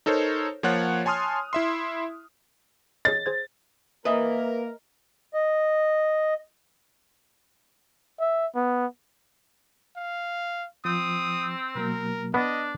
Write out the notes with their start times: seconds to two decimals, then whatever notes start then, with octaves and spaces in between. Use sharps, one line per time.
0.06 D#4 A4 A#4 C5 C#5
0.63 F3 A#3 F4 C#5 F#5 F#6
1.05 C#5 G#5 A5 C6 D#6 F6
1.53 E4 E5 C6
3.05 G#4 C#5 D#5 A6
3.26 G#4 C5 G#6
4.05 A#3 A#4 B4 D#5 E5 D#6
5.34 D#5
8.20 E5
8.55 B3
9.97 F5
10.85 F3 C4 D#6
11.75 B2 F#3 A#3 A#4
12.34 B3 D4 D#5